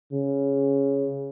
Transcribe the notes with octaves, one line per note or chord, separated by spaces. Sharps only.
C#3